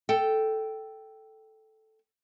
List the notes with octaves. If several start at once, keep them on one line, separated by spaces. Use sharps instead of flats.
A4 G5